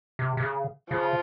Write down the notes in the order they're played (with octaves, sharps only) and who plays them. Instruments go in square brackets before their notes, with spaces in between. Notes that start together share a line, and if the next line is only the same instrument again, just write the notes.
[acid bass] C3
C3
C#3
[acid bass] C#3 [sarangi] F3